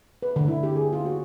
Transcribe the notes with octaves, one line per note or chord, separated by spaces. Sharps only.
B4
D3
E4
G4
G#4
F4
F#4